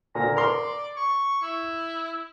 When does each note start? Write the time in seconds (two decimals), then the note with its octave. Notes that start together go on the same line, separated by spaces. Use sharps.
0.15 A#2 D3 A#5
0.36 A#4 D5 A#5 C6
0.97 C#6
1.42 E4